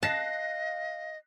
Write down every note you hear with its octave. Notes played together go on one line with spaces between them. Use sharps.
D#5 F5 A5 F#6 A#6 C7